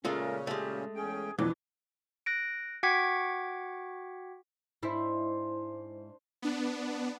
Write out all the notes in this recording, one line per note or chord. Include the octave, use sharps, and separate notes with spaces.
A#2 C#3 G#3 A3 C#4 F4 A#4
G#3 A3 G4
E2 C#4 G#4 G5
B1 F2 B2 E3 D4 B4 D6
F#6 A#6 D7
F#4 F#5 G5 D6 G#6 B6
G#2 D4 E4 C5
B3 D4